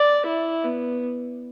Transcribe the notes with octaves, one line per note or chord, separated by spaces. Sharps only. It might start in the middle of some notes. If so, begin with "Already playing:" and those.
Already playing: D5
E4
B3